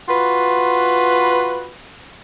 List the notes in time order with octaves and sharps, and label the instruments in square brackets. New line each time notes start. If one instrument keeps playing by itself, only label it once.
[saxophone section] F4 F#4 B4